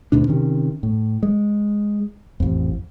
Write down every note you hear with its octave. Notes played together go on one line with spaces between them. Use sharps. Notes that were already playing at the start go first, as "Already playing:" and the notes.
D2 B2 D4
C3 D#3 C#4
A2
G#3
A1 F2